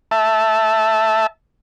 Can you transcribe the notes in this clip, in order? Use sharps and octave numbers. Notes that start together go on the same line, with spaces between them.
E5 A5